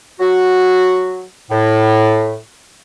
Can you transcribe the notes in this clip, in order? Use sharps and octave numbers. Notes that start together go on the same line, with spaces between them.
F#3 F#4
A2